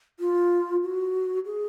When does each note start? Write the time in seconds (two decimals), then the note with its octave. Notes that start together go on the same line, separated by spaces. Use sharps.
0.20 F4
0.82 F#4
1.46 G#4